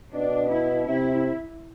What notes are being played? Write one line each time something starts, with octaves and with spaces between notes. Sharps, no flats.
B2 D4
E4
C3 E4